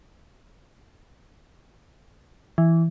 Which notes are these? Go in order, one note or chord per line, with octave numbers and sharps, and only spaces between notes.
E3